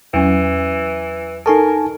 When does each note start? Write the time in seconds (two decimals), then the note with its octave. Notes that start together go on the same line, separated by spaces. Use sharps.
0.14 E2 E3 F#3 C#4
1.46 D#4 A4 A#4 G#5 A5 C#6